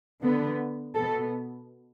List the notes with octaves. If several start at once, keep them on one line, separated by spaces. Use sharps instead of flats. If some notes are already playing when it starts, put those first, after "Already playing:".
D3 B3
B2 B3 A4